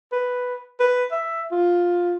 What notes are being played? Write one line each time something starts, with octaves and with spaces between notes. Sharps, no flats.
B4
B4
E5
F4